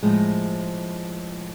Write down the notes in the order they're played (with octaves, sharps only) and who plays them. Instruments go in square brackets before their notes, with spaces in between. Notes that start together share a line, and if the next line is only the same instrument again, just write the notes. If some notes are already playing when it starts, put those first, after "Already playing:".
[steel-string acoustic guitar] A2 F3 G#3